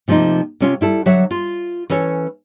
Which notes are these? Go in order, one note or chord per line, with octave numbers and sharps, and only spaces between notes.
C3 F3 A3 A#3 D#4
C3 C#4 F4
G3 E4 A4
D3 F#3 C#5 E5 F#5
F4
E3 C#4 A4 C#5